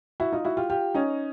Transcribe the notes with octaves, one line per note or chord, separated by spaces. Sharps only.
E4 F#4
D#4 F4
E4 F#4
F4 G4
F4 G4
C#4 D#4